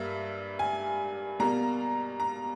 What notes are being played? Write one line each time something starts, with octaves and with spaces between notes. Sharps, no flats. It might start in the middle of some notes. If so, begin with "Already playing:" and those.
Already playing: G2 G3 A#3 E5
G#5
B2 G3 A#3 A#5
A#5